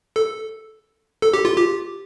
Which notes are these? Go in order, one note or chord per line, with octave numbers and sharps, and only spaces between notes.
A4
A4
G4
F4
G4